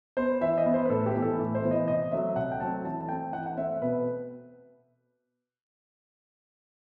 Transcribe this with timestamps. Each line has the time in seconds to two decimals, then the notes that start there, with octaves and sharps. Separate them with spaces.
0.17 B3 C5
0.41 E3 E5
0.58 D#5
0.66 B3
0.74 C5
0.85 B4
0.89 A2 A4
1.06 G4
1.15 E3 B3
1.22 A4
1.39 A2
1.55 C5
1.63 E3 B3
1.71 D#5
1.87 C3 D#5
2.11 F#3 A3 C4 E5
2.36 C3 F#5
2.52 G5
2.60 F#3 A3 C4 A5
2.85 E3 A5
3.00 A5
3.09 A3 C4 G5
3.33 E3 F#5
3.46 F#5
3.57 A3 C4 E5
3.81 B2 B4